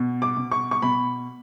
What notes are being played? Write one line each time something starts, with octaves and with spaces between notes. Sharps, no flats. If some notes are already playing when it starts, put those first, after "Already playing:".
Already playing: B2
D6
B2
C#6
C#6
B2 B5